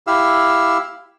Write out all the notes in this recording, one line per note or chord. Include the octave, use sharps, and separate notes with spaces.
E4 G4 F5 E6